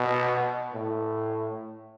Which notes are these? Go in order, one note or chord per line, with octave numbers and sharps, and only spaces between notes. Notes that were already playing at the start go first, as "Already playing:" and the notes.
Already playing: B2
A2